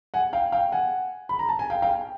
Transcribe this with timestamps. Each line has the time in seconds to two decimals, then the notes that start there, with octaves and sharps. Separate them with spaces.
0.14 F#5 G#5
0.33 F5 G5
0.52 F5 G5
0.72 F#5 G#5
1.29 B5
1.39 A#5
1.49 A5
1.59 G#5
1.70 F5 G5
1.82 F5 G5